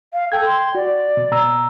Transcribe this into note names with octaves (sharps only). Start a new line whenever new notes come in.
F5
A4 G5 G#6
C6
F#4 D5
B2
B2 A#5 E6